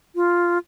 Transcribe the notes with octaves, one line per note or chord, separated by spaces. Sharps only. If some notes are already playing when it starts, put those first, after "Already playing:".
F4